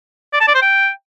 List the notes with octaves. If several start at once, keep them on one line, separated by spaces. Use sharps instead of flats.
D5
A5
D5
C5
G5